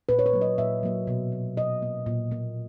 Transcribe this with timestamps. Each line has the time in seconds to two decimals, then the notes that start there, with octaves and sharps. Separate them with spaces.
0.09 A#2 B4
0.19 C#5
0.26 B4
0.33 F#3 A#3
0.41 D#5
0.58 A#2 E5
0.83 F#3 A#3
1.07 B2
1.32 A#3
1.57 B2 D#5
1.82 A#3
2.06 A#2
2.31 A#3